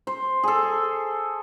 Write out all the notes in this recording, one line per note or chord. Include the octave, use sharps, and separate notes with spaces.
C5
G#4 A4